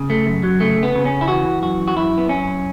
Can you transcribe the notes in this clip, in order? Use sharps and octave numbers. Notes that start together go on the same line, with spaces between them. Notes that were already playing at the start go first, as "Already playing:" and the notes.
Already playing: C#3
A3
F#2
F#3
C#3 A3
B3
C#3
C#4
E4
E3 F#4
F#2 F#4
F#4
F#2 E4
B3
F#2 C#4